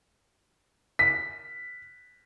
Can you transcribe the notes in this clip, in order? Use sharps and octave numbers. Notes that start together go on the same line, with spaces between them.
B6